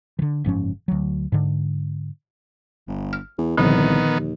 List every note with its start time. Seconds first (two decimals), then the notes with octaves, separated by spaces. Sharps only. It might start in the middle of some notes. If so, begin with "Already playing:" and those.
0.19 D3 E3
0.44 F#1 G#2 F3 C#4
0.88 D2 F#3
1.32 G#2 D3
2.88 G1
3.13 F6
3.38 E2
3.58 C2 A#2 D3 D#3 F3 B3
4.18 D#2